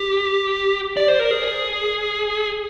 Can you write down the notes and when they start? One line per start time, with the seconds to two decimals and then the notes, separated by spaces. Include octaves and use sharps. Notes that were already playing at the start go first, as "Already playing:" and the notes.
Already playing: G4
0.97 D5
1.08 C5
1.19 A#4
1.31 G#4